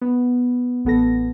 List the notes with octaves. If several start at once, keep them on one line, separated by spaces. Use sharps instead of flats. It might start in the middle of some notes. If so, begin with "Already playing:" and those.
B3
A1 B3 A4 A#6